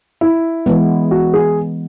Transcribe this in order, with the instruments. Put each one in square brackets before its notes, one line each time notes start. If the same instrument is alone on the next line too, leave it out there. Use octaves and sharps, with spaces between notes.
[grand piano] E4
[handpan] E3 G#3 B3
[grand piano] F#4
G#4